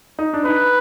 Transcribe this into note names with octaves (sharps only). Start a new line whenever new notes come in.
D#4
D4
D#4 B4